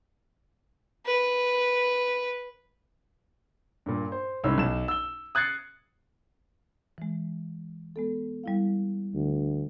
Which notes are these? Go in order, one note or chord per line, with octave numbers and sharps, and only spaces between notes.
B4
G2 A#2
C5
C2 G#2 C#4 E6
B1 E7
E6 G7
D#6 F#6 G#6 A6 C7 C#7
E3 G#3
G#3 B3 A4
G3 E4 F5
D2